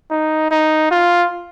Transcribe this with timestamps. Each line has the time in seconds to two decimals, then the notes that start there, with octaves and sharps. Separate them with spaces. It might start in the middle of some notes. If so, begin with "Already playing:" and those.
0.11 D#4
0.51 D#4
0.91 F4